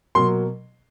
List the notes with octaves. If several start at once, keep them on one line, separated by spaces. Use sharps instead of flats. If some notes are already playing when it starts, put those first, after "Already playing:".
B2 F#3 A#3 C6